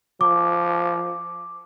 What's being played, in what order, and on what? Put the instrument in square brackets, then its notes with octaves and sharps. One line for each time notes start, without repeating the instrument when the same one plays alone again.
[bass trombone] F3 [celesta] D6